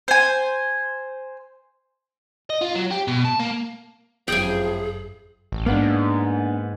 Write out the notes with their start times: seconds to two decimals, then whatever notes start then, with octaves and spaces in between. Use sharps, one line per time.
0.08 C5 G#5
2.50 D#5
2.61 F4
2.75 F#3
2.91 G4
3.08 B2
3.25 A5
3.40 A#3
4.28 G1 F#2 A2 C3 F3 G#4 G5 G#5
5.52 A1
5.66 G#2 A#3 B3 D4